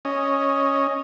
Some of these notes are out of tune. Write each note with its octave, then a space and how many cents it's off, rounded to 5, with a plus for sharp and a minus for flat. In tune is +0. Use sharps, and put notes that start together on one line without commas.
C#4 +0 D#5 +0